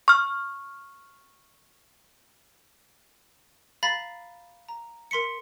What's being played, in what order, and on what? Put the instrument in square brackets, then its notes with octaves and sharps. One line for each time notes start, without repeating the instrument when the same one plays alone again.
[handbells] C#6 F6
[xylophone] F5 A#5 B5 A6 B6
A#5
A#4 C6 B6 C#7